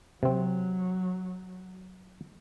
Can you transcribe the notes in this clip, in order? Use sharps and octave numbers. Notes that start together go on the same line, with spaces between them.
C3 F#3 C4